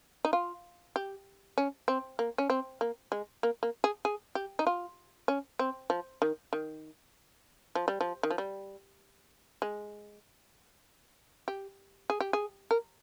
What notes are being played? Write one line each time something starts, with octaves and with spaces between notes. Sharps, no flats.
D#4
F4
G4
C#4
C4
A#3
C#4
C4
A#3
G#3
A#3
A#3
G#4
G#4
G4
D#4
F4
C#4
C4
F3
D#3
D#3
F3
G3
F3
D#3
F3
G3
G#3
G4
G#4
G4
G#4
A#4